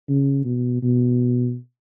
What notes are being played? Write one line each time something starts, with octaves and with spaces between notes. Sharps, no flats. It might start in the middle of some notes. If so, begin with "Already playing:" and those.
C#3
B2
B2